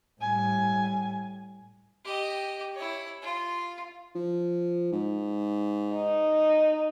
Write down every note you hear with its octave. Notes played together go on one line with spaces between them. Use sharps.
A2 G3 G#5
G4 D#5
E4 C#5
F4
F3
G#2
D#4